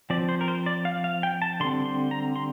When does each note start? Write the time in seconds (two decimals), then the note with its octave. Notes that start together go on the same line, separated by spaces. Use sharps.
0.10 F3 C4 D5
0.29 C5
0.41 A#4
0.48 C5
0.66 D5
0.85 F5
1.04 F5
1.23 G5
1.42 A5
1.60 D3 G3 C4 C6
1.86 C6
2.11 A#5
2.36 C6